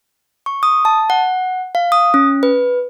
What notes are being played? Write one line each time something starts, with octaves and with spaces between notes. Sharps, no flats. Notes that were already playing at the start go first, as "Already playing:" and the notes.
C#6
D#6
A5
F#5
F5
D#6
C#4
B4